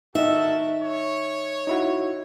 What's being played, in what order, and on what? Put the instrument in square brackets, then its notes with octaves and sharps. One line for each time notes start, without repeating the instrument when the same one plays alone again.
[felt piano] D#3 D#5 [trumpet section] F#4 A4 A#4 [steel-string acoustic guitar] E5
[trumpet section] C#5
[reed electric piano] D#4 E4 F#4